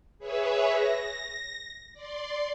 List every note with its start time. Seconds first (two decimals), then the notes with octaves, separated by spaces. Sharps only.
0.19 G#4 B4 C#5 E5
0.70 A#6
1.93 D5 C6